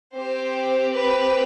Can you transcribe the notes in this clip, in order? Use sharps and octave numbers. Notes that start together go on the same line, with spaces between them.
C4 G4 C5
B4